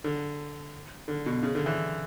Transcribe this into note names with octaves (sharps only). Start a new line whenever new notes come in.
D3
D3
B2
C#3
D3
E3